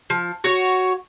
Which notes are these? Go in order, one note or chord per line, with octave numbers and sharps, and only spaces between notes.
F3
F#4 C#5